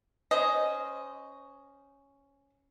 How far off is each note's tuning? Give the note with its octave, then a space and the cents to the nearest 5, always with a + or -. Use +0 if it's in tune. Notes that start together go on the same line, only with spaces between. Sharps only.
C#4 +0 C5 -20 D#5 +0